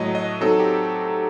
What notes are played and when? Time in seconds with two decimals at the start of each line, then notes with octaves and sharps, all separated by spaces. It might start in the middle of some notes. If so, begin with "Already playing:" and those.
Already playing: A2 F#3 A3 D#5
0.15 D#5
0.41 F#3 C4 D#4 A4
0.59 G4